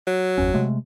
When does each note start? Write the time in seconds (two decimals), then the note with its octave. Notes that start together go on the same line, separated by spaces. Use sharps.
0.07 F#3
0.38 G1 E2 C#4
0.54 C3 G#3 A3